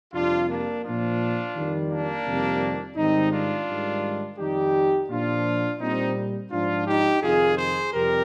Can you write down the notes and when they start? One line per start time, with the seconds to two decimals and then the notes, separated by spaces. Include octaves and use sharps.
0.13 F2 C3 G3 D4 F4
0.48 A#3 D4
0.83 A#2 F3 D4 F4
1.55 F2 D#3 G3
1.90 A#3 D4
2.26 F2 C3 D#3 G3
2.96 G#2 D#3 G3 C4 D#4
3.32 D4 F4
3.68 G#2 D#3 G3
4.38 F2 D#3 G3 D#4 G4
5.09 A#2 F3 D4 F4
5.80 A#2 G3 C4 D#4
6.51 G#2 F3 D4 F4
6.86 D#4 G4
7.22 F2 C3 D#3 F4 G#4
7.58 G#4 C5
7.93 F2 C3 G3 G4 A#4